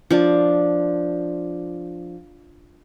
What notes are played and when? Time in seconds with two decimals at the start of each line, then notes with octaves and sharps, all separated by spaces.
0.11 F3 D4